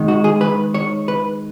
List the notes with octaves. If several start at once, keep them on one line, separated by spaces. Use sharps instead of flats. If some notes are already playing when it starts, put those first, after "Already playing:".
Already playing: D#3 G#3 D#4
F#4
G#4
B4
C#5
B4